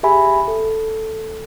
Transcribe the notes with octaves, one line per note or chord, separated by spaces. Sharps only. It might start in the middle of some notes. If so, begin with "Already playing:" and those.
G4 G#4 E5 G#5 B5
A4